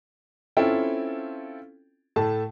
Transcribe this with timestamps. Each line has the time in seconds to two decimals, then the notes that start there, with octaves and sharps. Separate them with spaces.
0.57 C4 C#4 E4 F4 A4 G5
2.16 A2 A3 A5